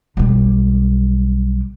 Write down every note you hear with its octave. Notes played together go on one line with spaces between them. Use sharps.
B1 G3